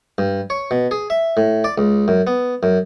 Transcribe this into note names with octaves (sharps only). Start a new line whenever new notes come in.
G2
C#5
B2
G#4
E5
A2
D5
C#2
F#2
B3
F#2